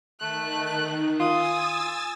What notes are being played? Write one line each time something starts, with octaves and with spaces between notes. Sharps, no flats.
D#3 A3 F#6
F4 G#5 D#6 E6 A6